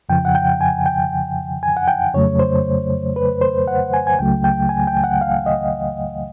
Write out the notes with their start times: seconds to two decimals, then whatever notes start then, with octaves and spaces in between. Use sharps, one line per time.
0.09 F2 C#3 F3 G5
0.25 F#5
0.35 G5
0.61 G#5
0.86 G5
1.63 G#5
1.77 F#5
1.88 G5
2.14 F2 C#3 F#3 A3 C#5
2.39 C5
3.16 B4
3.41 C5
3.67 F#5
3.94 G#5
4.07 G#5
4.19 C#2 C#3 F#3 A3 G5
4.44 G5
4.69 G#5
4.87 G5
5.04 F#5
5.21 F5
5.46 D#5